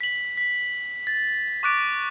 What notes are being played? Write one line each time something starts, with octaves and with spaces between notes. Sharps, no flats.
B6 F#7
B6
A6
C#6 D6 F#6 A6 D7